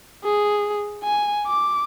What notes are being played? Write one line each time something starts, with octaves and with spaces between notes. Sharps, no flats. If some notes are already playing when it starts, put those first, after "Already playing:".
G#4
G#5
D6